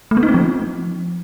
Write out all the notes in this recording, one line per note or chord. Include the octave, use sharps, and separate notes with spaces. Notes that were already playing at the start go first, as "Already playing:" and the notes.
A3
B3
D#4
C4
F3